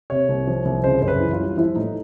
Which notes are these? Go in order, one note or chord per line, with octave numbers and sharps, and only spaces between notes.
C3 C#5
C2
F3
C2
C#3 C5
F#2 C5
B4
E3
F4
G3
F3 E4
A2 D#4